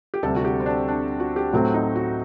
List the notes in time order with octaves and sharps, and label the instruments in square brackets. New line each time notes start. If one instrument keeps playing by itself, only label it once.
[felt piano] G4
[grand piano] D2 C3 G3 [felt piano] A4
[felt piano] F#4
G4
C4
D4
D4
F#4
G4
[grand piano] A2 F#3 A3 C4 [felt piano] F#4
[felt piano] D#4
F#4